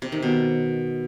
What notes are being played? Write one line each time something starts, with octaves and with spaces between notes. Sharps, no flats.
C3
D#3
B2